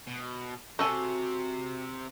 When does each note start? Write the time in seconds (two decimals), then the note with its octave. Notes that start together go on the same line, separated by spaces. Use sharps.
0.07 B2
0.79 C3 F#4 A4 G#5